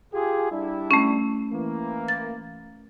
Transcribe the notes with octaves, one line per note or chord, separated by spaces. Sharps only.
F4 G4 G#4
G3 D4 E4
A3 C#4
E3 A#3
A6